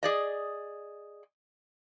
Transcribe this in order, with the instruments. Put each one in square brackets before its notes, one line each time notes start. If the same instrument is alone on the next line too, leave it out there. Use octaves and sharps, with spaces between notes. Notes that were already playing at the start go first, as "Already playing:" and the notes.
[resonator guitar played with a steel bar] G#4 D5 D#5